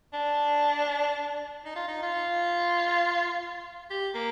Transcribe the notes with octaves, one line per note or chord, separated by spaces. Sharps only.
D4
D#4
F4
D#4
F4
G4
A#3